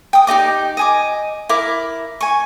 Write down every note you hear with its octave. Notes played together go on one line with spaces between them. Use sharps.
G5 D#6
D#4 G4 D#5 D6
D#5 G#5 D6
E4 A#4 D6
G#5 C#6